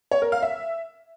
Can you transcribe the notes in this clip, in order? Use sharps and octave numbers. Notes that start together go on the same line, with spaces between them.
C#5
A#4
F5
E5